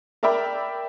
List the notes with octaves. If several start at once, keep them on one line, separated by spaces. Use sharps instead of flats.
A#4 D5 E5 G5 B5